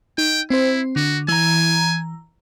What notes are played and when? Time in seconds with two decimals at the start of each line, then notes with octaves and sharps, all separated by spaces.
0.18 D#4 G5
0.50 C4 E4 C5
0.96 D3 F#4
1.28 E3 G#5 A#5